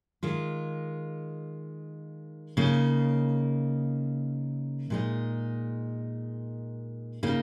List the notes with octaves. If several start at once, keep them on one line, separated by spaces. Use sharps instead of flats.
D#3 G#3 F4
C#3 A#3 D#4
A#2 G#3 D#4
C#3 A#3 D#4